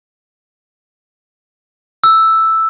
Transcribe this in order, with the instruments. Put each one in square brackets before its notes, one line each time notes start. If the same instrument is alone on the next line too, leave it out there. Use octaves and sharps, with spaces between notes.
[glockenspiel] E6